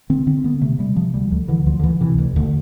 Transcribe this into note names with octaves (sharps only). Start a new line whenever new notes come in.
D3 C4
D3 C4
D3 B3
C3 A3
C3 G3
C3 F3
D2 G3
D2 F3
D3 E3
D2 F3
D3
D2 E3
C3 E3
D2
D2 D3